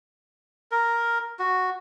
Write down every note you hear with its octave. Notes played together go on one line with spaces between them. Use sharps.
A#4
F#4